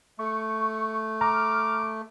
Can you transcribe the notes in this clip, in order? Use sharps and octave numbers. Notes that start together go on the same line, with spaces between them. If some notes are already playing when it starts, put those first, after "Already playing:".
A3 C#6
A#5 D6 F6